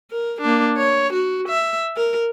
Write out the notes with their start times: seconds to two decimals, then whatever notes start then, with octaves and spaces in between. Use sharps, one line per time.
0.11 A#4
0.41 A#3 D4
0.77 C#5
1.13 F#4
1.48 E5
1.96 A#4